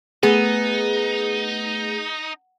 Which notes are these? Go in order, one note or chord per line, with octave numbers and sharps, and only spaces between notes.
A3 B3 D#4 G#4